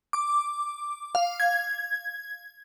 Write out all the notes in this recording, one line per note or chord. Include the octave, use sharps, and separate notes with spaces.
D6
F5
G#6